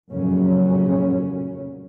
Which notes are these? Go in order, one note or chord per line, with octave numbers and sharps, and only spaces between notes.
F1 F#2 A#2 C#3 F#3 C#4